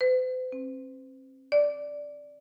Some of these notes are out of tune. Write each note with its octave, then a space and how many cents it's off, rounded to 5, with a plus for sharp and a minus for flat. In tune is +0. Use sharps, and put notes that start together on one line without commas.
C5 -45
C4 +35
D5 -5